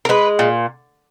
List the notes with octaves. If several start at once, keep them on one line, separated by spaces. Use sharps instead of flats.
A#4
G#3 B4
A#2